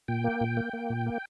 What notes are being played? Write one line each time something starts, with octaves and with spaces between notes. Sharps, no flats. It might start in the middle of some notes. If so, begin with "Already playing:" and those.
A#2 G5
A#3
A#2
A#3
A#3
A#2
A#3